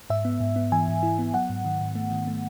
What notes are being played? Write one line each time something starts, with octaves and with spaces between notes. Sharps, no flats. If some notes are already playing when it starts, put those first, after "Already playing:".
G#2 E5
B3
G#2
B3
E3 G#5
G#2
E4
B3
F#3 F#5
G#2
D#3
G#2
A3
D#3
A3